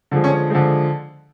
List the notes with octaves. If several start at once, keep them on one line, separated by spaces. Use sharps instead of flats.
D3 F3 G#3
C#4
D3 F3 G#3